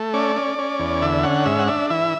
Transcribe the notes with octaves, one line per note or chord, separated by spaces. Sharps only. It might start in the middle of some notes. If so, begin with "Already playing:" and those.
Already playing: A3
C#4 D5
C#4
C#4
E2
D3 E5
C#4 F#5
G#2 E5
F#5
D4 E5
E3 E5